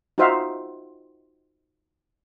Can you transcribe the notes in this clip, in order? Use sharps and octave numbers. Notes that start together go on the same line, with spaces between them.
D#4 F4 F#4 C5 E5 F5